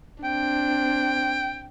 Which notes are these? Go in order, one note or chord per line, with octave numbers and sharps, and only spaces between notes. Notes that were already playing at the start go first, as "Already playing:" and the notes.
C4 D4 G5